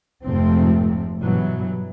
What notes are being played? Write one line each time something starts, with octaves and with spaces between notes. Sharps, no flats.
F1 G#2 C3 F3 A3 C4
G2 B2 E3 F#3